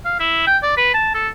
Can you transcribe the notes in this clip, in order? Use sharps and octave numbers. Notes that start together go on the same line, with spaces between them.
F5
E4
G5
D5
B4
A5
A4